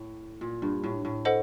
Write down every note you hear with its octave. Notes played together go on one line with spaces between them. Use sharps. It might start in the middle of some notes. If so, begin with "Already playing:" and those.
Already playing: A2
A#2
G2
A2
A2
A4 C5 D#5 F#5